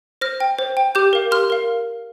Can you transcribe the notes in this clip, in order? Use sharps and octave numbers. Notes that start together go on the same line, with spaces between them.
C5 F6 A#6
G5
C5
G5
G4 D6 G6
A#4 F5
G4 C6 F6
A#4 F5